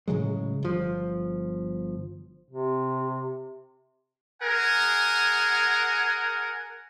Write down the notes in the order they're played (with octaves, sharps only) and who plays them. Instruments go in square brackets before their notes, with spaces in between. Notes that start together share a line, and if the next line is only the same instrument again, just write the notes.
[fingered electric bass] A2 C#3 F#3 G#3
G1 F3
[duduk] C3
[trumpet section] G#4 A#4 F#5 G#5